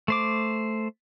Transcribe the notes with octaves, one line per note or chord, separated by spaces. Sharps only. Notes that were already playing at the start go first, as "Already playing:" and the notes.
A3 C5 D6